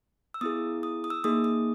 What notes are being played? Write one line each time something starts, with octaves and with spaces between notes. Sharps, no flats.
E6
B3 E4 G#4 D#6
D#6
D#6
E6
A#3 D#4 G#4 D#6
D#6